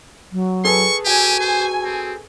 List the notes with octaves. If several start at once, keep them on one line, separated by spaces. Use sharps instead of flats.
F#3
G#4 A4 B4 C#6
F#4 G4 G#5
C5
C4